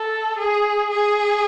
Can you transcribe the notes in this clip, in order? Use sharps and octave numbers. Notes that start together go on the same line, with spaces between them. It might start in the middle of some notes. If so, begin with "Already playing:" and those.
Already playing: A4
G#4
G#4